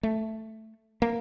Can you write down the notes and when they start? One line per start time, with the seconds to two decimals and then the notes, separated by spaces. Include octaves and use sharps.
0.03 A3
1.02 A#3